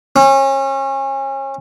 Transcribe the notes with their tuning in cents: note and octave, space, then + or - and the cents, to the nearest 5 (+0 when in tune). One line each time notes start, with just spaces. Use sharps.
C#4 -30